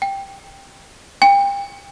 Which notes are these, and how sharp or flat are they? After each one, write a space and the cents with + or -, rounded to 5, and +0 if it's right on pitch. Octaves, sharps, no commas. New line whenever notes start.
G5 +5
G5 +30